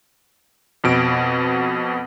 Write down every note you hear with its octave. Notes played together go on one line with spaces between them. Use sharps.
F2 B2 D7